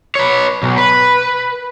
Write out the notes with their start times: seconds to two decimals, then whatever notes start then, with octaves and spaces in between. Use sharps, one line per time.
0.15 B4 C#5
0.63 B1
0.78 B4